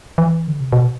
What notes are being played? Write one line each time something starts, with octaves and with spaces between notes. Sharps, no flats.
E3
D3
C3
B2